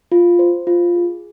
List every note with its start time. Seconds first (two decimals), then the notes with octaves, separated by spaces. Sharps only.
0.12 F4
0.39 C5
0.67 F4
0.96 G#4